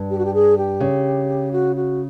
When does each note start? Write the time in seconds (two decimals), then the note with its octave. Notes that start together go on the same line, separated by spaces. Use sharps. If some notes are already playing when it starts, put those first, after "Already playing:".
Already playing: G2
0.10 G4
0.18 F#4
0.25 G4
0.33 G#4
0.57 G4
0.80 C#3
1.52 F#4
1.75 F#4